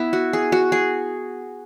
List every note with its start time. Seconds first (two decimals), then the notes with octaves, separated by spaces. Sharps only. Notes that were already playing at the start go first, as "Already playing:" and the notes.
Already playing: B3 E4
0.13 F#4
0.33 G#4
0.52 F#4
0.72 G#4